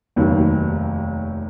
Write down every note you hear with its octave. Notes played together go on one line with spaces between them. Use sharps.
F1 D#2 D#3 F#3